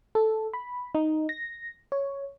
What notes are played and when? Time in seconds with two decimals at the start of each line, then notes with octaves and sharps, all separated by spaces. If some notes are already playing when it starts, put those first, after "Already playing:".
0.15 A4
0.53 B5
0.95 D#4
1.29 A#6
1.92 C#5